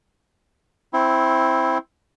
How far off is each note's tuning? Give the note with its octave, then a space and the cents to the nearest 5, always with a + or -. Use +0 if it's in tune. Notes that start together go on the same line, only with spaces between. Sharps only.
C4 +0 E4 +0 C6 +35